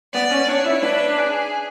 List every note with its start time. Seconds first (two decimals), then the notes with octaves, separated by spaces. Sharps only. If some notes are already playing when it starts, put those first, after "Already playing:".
0.14 B3 D5
0.31 C#4
0.49 D4 C#5
0.66 E4
0.83 D4 B4
1.17 G#4